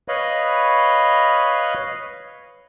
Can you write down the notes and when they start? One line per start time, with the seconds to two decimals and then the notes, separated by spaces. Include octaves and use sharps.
0.08 B4 C#5 D#5 F5 B5